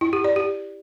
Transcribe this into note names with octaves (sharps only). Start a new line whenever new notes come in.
E4
G4
D5
G4